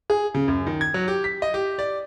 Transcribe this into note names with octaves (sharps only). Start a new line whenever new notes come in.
G#4
C#3
F#2
D#3
G#6
F#3
G4
B6
D#5
G4
D5